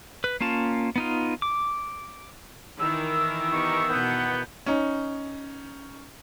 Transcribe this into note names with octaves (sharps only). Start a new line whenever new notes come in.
B4
A#3 C#4 F4 A5
B3 D#4 F4
D6
D#3 E3 A#4 E6
B3 D#4 G4 C#6
B2 B3 F#5 G6
C#4 D#4